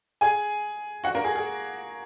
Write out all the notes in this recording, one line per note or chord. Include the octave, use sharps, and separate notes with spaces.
G#4 G#5
F#4 F#5
A#3 A#4
G#4
G#4